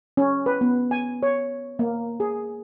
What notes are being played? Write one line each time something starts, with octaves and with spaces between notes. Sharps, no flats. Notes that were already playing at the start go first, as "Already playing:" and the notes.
C#4
B4
B3
G#5
C#5
A#3
G#4